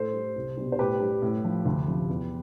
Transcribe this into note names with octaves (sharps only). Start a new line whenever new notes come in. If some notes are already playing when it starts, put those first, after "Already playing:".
Already playing: A2 A4 C5
G3
C2
B2 G3
C5
A2 G4 B4
G3
A2
F3
D2
C3 F3
E2